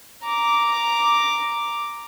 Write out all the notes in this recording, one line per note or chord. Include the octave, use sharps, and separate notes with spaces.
A#5 D6